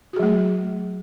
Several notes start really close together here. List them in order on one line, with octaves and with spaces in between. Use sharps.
F#4 G#4 F#3 A3